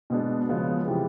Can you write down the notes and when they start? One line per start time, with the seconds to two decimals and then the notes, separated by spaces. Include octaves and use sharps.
0.10 B2 G#3 B3 D4
0.49 C#3 F3 G#3 B3
0.87 C3 E3 G3